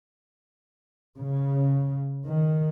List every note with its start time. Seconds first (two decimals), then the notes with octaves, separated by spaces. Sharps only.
1.16 C#3
2.25 D#3